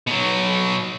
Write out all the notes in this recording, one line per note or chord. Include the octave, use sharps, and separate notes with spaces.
B2 F#3